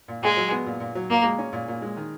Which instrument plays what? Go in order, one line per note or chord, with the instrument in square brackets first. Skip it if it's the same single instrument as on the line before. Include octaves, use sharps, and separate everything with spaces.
[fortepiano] A#2
[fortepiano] A#2 [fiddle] G#3
[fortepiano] F#3
B3
A#2
A#2
F#3
[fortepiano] A#2 [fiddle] A#3
[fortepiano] G#3
C#4
A#2
A#2
G#3
D#3